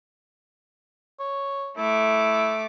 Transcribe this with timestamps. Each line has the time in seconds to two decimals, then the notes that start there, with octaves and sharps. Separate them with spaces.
1.20 C#5
1.77 A3 E4 D6